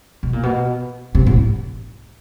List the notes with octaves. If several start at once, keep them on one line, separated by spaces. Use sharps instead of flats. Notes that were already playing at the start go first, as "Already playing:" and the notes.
B2
A#2
B2
C3
A2